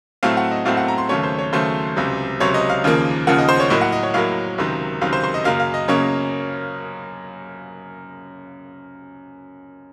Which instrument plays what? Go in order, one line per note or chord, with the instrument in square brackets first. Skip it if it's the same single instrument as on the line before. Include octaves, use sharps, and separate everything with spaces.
[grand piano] A2 F#3 A3 C4 F5
F#5
D#5
A2 F#3 A3 C4 F5
F#5
A#5
C6
D#2 C#3 F#3 A3 C#5
C5
C#5
D#2 C#3 F#3 A3 C5
C#2 C3 F#3
C#2 C3 F#3 C#5
D#5
F5
D#2 C#3 F3 A#3
D#2 C#3 F3 A#3 F#5
D#5
C5
C#5
A2 F#3 A#3 D#5
F#5
D#5
C#5
A2 F#3 A#3 F5
C#2 C3 D#3 F#3
C#2 C3 D#3 F#3 F5
C5
C5
D#5
F#2 C#3 F#3 A#3 F5
F5
D#5
F#2 C#3 F#3 A#3 C#5